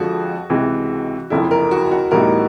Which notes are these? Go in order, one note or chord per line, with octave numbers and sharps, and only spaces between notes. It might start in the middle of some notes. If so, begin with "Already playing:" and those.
Already playing: F2 D3 F3 G#3 F#4
C#2 C3 E3 G#3
F#1 F2 D3 E4
A#4
F#4
F#4
A2 E3 G3 B3 D#4 A#4